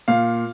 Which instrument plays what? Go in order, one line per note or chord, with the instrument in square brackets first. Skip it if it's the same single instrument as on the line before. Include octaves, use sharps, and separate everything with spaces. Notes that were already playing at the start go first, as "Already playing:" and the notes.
[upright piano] A#2 F5